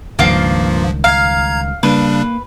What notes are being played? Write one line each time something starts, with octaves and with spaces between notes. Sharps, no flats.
C#2 G2 D#3 F3 G3 A#3 F4
F5 A#5 G#6
C#3 G3 A#3 D4 B4